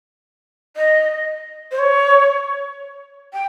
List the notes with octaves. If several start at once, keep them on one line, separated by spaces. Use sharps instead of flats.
D#5
C5
C#5
G5